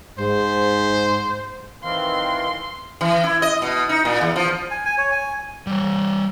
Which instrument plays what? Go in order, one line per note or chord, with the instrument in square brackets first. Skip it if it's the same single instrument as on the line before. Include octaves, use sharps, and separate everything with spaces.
[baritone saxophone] G#2 [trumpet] C5
[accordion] D#3 E3 C4 [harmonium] F5 [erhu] C6
[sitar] E3
E4
D#5
B2
D#4
A#2
E2
F3
[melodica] G#5
G#5
C#5
G#5
[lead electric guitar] G3 C#5